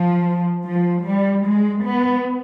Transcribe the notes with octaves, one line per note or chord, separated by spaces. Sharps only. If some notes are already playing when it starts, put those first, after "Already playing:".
Already playing: F3
F3
G3
G#3
B3